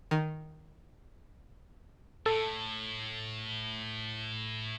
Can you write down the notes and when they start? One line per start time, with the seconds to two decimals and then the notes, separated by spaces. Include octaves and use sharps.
0.11 D#3
2.26 A2 A4